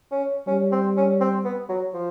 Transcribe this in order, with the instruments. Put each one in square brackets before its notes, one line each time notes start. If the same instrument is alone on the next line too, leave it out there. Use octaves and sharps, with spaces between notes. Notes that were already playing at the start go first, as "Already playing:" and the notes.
[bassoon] C#4
[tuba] G3 [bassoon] C#4
[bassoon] C4
C#4
C4
B3
F#3
F3